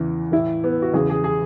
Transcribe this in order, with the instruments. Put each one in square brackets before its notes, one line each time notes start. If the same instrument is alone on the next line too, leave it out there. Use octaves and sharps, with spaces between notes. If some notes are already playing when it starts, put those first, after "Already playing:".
Already playing: [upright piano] E2 C#3 E3
A2 E3 E4
B3
F#4
E2 C#3 E3 G#4
G#4
G#4